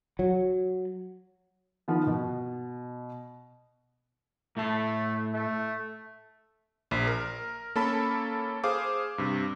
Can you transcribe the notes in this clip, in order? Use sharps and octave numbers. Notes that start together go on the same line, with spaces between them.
F#3
D#3 F3 B3
B2
A2 A3 A5
A3
A#1
A#4
A#3 C#4 A4 A5 B5
G#4 C5 F5 D6
G2 C3